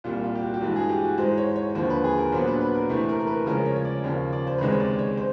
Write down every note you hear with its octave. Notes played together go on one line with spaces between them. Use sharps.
C2 A#2 G3 F4
F4
G4
F#4
G4
G2 E3 G#3 F#4
G#4
G4
F#4
G#2 E3 G#3 C5
C#5
C#5
D#2 D3 F3 C5
B4
G#4
A#4
A#2 F#3 B3 D4 C5
B4
B4
A#4
C3 E3 A3 C4
A#4
A#4
B4
C#3 F3 G#3 C#4 A#4
C#5
C#5
D5
D#2 C#3 F3 A#3 C#5
D5
C5
B4
C#2 C3 D#3 G#3 C5
C#5
D5
C#5
C5